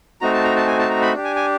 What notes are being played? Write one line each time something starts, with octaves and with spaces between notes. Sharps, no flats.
A3 C4 D#4 F#4 A#5
A5
A#5
A5
G#5
A5
A#5
B5
D4 G4
G#5
G#5